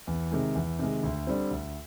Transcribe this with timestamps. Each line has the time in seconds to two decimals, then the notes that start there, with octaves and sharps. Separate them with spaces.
0.07 E2
0.31 C3 D#3 G#3
0.55 E2
0.79 C3 D#3 G#3
1.03 D2
1.27 D3 G3 C4
1.51 D2